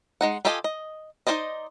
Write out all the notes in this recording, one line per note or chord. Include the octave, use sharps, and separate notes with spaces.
G#3 D#4 F#5
F4 G4 A4 D#5 G#5
D#5
D#4 F#4 C5 D5 D#5